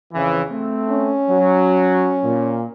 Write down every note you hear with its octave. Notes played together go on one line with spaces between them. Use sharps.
F2 C#3 E3
A3 C4
C#4
F#3
A#2